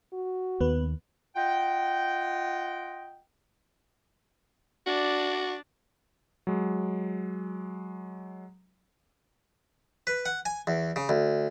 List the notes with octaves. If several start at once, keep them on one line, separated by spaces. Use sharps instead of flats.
F#4
D#2 B3 B4
F4 D#5 F#5 G5
D4 F#4 D5
F#3 G#3
B4
F#5
G#5
E2
C#3
D2